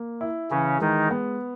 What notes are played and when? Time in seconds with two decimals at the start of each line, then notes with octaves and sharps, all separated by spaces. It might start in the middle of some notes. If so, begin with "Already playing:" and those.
Already playing: A#3
0.21 E4
0.51 C#3 E3 C#4
0.80 D#3 G#3 D#4
1.11 B3